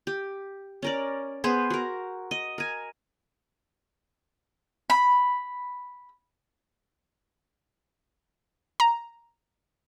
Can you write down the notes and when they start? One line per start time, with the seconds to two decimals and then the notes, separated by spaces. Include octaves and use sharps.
0.07 G4
0.82 C#4 A#4 D5
1.44 B3 G#4 B4 C5
1.70 F#4 A#4
2.31 D#5
2.58 A#4 G#5
4.90 B5
8.80 A#5